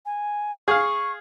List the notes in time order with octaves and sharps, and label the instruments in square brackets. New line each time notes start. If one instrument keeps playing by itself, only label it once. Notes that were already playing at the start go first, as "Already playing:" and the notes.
[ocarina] G#5
[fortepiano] G#4 F5 [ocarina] C#6